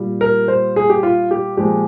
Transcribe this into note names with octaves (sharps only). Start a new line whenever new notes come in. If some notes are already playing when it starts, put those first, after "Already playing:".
Already playing: A#2 G3
A#4
C5
G#4
G4
F4
G4
A#2 F3 G#3 G4